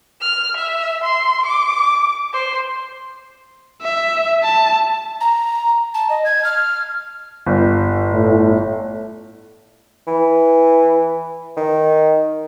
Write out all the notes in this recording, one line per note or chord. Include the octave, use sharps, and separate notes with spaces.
F6
E5
C6
D6
C5
E5
A5
A#5
A5
D#5
G#6
F6
G1
A2
E3
D#3